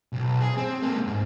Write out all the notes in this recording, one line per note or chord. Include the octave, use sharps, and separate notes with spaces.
B1
G#4
C4
G#3 A#3
G#2